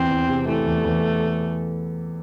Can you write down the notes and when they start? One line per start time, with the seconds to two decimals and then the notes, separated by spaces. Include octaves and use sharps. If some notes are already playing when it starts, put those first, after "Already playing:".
Already playing: E2 C4
0.11 E2
0.29 C3
0.48 E3 A3
0.66 E2
0.85 E2